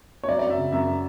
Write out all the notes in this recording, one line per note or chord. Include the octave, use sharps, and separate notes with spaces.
C#5
F#3 D5
F#2 D5
E5
C#3
F#2 E5
F#3